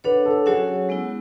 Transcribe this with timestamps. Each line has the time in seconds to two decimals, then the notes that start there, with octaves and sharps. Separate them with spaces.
0.04 D4 A4 B4 C#5 F#5
0.26 A4
0.46 F#3 C#4 F#4 G#4 C#5 F#5
0.89 G#3 B3 E4